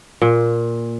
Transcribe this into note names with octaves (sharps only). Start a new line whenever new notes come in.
A#2